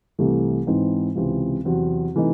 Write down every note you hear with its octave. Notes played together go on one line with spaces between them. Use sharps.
C2 C3 E3 A3
G#2 E3 C4 D#4
C#2 C3 E3 C4
E2 C3 F#3 C4 F#4
C3 E3 A3 D#4